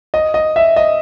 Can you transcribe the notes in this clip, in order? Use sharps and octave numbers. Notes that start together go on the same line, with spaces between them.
D#5
D#5
E5
D#5